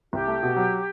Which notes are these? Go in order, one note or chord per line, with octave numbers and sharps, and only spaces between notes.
C2 G4
A3
B2
F#3